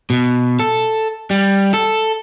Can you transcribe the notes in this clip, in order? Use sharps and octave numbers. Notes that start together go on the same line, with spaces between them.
B2
A4
G3
A4